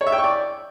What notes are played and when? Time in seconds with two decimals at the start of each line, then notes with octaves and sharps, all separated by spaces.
0.01 C#5
0.07 E5
0.12 G5
0.18 C#6
0.24 D5